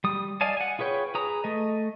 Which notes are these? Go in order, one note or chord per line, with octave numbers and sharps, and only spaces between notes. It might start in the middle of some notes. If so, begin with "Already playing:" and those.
G3 D#6
D5 D#5 F5 G#5 A5
F#5 G#5
F4 G#4 B4 C#5 G5
G#4 B4 A#5 D#6
A3 D#5